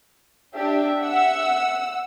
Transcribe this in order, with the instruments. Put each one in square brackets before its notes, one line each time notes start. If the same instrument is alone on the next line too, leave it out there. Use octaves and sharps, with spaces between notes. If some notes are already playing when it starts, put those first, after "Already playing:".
[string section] D4 G4 [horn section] E5
[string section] F#5 E6